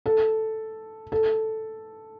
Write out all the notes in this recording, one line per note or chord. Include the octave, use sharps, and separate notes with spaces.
A4
A4